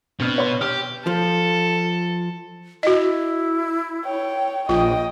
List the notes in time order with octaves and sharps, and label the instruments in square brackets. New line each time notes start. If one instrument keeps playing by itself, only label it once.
[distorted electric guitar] B2 [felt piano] C4 D4 F6
[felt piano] B4 C#5 C6
[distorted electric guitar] G4 [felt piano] F6
[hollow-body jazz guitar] F3 [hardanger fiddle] A4
[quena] E4 [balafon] F#4 D#5
[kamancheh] C#5 G5
[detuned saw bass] A#1 [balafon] F4 [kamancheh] D#5 [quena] G5